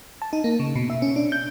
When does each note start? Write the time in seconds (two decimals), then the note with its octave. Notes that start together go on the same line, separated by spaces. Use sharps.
0.22 A5
0.33 D#4
0.44 A#3
0.60 C#3
0.75 B2
0.90 E5
1.02 C#4
1.16 D4
1.32 G6